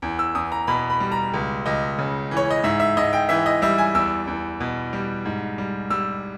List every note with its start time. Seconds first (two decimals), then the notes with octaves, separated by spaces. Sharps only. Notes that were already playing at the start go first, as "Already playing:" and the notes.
0.02 E2
0.19 E6
0.35 E2 D#6
0.52 A#5
0.67 B2 B5
0.90 B5
1.00 G3
1.12 A#5
1.33 C#2
1.66 C#2 D#5
1.99 C#3
2.31 E3
2.37 C#5
2.50 D#5
2.64 G#2 E5
2.80 E5
2.97 G#2 D#5
3.13 G5
3.29 E3 E5
3.46 D#5
3.62 G3 E5
3.78 G#5
3.95 E2 E6
4.27 E2
4.60 B2
4.93 G3
5.25 G#2
5.58 G3
5.90 G3 E6